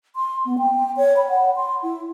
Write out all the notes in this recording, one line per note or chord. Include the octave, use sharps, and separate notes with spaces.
C6
B3
G5
C#5
B5
F#5
C6
E4